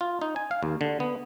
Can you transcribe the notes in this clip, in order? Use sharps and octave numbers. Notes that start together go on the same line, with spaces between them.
F4
D#4
G#5
F5
D#2
D3
B3